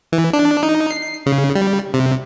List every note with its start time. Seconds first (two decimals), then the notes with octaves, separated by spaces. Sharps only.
0.13 E3
0.33 D4
0.63 D#4
0.91 C7
1.26 C#3
1.55 G3
1.94 C3